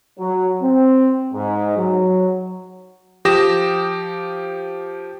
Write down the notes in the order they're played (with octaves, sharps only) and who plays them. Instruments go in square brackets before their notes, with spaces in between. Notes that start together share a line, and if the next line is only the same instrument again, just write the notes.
[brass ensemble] F#3
C4
G#2
F#3
[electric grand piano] F3 G4 D#6 A#6 E7